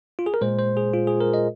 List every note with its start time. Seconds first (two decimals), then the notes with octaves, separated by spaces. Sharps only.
0.19 F4
0.26 G#4
0.34 A#4
0.41 A#2 G#3 C5
0.59 C5
0.77 G#4
0.93 F4
1.07 G#4
1.20 A#4
1.34 D#5